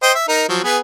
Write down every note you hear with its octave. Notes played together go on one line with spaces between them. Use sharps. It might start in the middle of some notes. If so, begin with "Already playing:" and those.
C5 D#5 G5
E5
D#4 A#4
F3 F#3
B3 G#4 B4